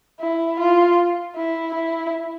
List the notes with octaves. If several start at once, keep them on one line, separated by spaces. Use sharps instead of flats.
E4
F4
E4
E4